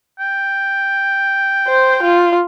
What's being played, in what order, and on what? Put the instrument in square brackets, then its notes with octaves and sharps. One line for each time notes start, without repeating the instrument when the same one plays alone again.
[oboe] G5
[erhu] C5
F4